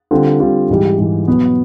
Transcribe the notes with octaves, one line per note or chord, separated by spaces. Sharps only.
D3 G3 C4 F4
D3 G3 C4 F4
G#2 E3 G3
G#2 E3 G3
B2 F#3 B3